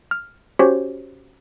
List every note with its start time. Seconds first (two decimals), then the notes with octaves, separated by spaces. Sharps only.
0.11 F6
0.59 C#4 F#4 G4 C5 C#5